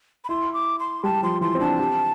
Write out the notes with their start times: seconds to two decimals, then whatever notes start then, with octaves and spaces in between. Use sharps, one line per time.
0.24 B5
0.29 E4 C6
0.54 D6
0.80 C6
1.03 G3 A5
1.23 F3 C6
1.41 E3 C6
1.55 C4
1.60 D4 A5
1.79 G4